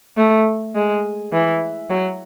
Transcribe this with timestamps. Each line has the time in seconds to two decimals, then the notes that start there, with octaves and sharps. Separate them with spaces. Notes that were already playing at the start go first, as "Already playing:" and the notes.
0.17 A3
0.75 G#3
1.33 E3
1.90 F#3